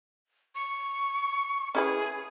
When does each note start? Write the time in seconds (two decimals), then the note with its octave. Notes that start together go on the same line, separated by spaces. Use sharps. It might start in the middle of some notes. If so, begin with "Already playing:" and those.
0.55 C#6
1.75 C#4 E4 G#4 B4